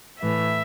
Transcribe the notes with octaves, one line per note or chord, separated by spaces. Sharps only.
A2 E3 E5